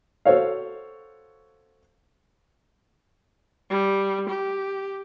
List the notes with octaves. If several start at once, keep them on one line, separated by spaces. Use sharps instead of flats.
F#4 A4 C5 C#5 F5
G3
G4